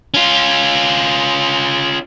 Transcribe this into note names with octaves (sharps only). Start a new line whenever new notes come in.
C#4 F4